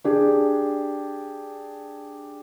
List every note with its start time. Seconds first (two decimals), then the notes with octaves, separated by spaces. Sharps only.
0.04 D4 G4 G#4